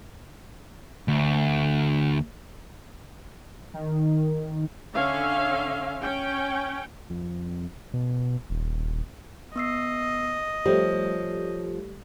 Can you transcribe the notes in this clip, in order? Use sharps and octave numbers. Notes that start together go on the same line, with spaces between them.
D2
D#3
D3 C#4 E5 F5
C#4 G5
F2
B2
D#1
B3 D#5 E6 C7
F3 G3 A3 C#5